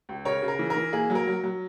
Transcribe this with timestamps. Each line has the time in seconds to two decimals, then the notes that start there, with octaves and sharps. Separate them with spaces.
0.09 C#2
0.25 C#3 A#4 C#5
0.42 C#3
0.48 A#4
0.59 E3
0.70 A#4
0.76 E3
0.93 A#3 G#4
1.10 F#3
1.15 A#4
1.27 F#3
1.44 F#3